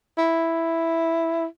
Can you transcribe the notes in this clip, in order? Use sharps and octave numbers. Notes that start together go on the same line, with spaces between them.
E4